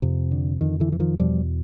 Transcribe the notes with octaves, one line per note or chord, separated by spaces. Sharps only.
F2 C3
D3
F2 D3 D#3
D3 E3
E3
D#3 F3
E2 B2 F3 G3